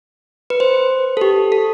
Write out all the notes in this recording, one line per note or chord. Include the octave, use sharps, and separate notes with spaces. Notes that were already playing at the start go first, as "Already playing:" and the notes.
B4
C5
A4
G4
A4